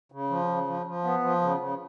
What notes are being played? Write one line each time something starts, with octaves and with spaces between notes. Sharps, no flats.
C#3
F3
C#3
F3
F3
B3
F3
C#3
C#3